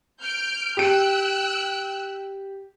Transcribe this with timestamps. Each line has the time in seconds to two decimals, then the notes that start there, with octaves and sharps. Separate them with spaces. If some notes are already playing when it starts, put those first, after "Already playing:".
0.20 F6 G6 D7
0.77 G4 G5 E6 F#6 D7